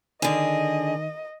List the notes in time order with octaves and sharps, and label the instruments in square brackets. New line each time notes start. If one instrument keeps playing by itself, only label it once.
[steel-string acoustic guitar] D3 G#4 [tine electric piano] D#3 [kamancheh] D#5